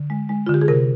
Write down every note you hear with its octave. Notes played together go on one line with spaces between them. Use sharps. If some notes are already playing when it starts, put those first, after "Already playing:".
Already playing: D3
G#3
G#3
D3 F4
G4
G#4
C3 A#4